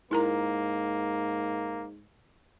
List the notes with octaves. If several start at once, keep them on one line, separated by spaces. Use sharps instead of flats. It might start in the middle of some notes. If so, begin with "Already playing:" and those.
G#2 A#3 E4 A#4 A#5